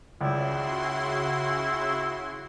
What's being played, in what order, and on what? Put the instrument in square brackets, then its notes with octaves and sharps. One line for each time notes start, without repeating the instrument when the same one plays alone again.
[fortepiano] C#2 D5 [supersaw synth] C#3 F#4 C6 [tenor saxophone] E4